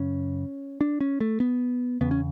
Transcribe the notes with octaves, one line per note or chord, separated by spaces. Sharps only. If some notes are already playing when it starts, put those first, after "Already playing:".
Already playing: F#2 C#3 C#4
D4
C#4
A3
B3
E2 C#3 B3
C#4